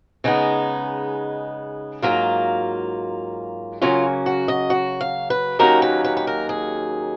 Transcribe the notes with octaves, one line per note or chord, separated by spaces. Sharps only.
C#3 G#3 B3 D#4
G#2 F#3 A#3 F4
C#3 F#3 A#3 C#4 F4
F#4
D#5
F#4
F5
B4
D#2 D#3 F#3 A#3 C#4 A#4
B4
B4
B4
A#4
G#4